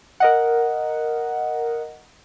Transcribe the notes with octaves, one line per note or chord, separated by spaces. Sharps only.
A#4 D#5 F#5